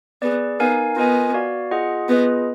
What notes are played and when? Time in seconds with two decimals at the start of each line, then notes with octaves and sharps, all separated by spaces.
0.22 B3 G#4 B4 D5
0.60 B3 D#4 A#4 F5 G#5
0.96 B3 F4 A#4 D#5 G#5
1.34 F#4 D5 F5
1.71 F4 G#4 D#5 F#5
2.09 B3 F4 G#4 B4 D#5